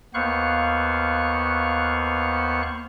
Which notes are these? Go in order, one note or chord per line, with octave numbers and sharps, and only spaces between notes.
D#2 B3 C5 F5 C#6 F#6